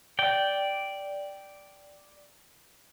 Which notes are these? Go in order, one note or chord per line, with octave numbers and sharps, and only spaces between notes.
D5 G5